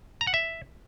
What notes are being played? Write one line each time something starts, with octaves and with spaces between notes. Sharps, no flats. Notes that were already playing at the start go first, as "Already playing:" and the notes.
A#5
F#5
E5